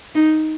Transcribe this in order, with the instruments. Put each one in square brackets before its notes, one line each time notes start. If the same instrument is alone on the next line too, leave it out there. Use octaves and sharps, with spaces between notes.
[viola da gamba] D#4